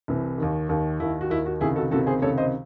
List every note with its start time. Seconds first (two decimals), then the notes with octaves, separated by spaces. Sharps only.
0.08 C2 C3 E3
0.38 D#2 D#3
0.69 D#2 D#3
1.00 D#2 D#3 E4
1.21 F#4
1.30 D#2 D#3 E4
1.46 F#4
1.61 C#2 C3 D#3 E4 G#4
1.76 F#4 A4
1.91 C#2 C3 D#3 F#4 A4
2.07 G#4 C5
2.22 C#2 C3 D#3 A4 C#5
2.38 C5 D#5